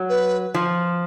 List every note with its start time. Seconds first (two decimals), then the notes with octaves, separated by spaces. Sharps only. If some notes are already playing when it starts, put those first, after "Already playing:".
Already playing: F#3
0.09 B4
0.54 F3